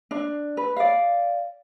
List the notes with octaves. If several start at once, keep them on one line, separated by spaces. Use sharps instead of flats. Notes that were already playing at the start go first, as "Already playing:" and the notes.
D4
B4
D5 F5